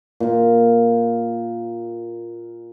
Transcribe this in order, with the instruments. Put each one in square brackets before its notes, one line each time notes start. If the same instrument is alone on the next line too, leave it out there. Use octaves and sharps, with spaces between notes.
[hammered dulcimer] A#2 F5